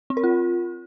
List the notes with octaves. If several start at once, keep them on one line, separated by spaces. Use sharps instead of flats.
C4
A#4
F4